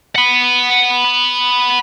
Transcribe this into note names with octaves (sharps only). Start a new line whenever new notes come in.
F#5 B5